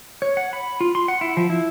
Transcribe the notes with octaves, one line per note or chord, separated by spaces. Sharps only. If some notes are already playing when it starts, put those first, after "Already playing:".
C#5
F#5
B5
F4
C6
F#5
E4
F3
E4